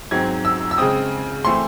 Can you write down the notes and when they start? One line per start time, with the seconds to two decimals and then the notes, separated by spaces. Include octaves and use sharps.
0.11 G#2 F#3 C4 G#6
0.45 E6
0.71 E6
0.78 C#3 G#3 C4 D#6
1.45 E3 A3 C4 C6